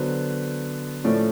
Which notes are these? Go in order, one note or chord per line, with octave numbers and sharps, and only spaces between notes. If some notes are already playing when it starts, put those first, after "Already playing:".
Already playing: D3 F#3 B3 C5
A2 F3 A3 C#4 D5